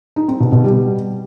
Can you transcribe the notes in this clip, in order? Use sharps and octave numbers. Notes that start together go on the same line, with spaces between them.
D#4
C4
B2
B2
G3